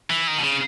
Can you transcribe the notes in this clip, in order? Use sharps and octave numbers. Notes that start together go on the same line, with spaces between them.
E3
D#3
B2
C#3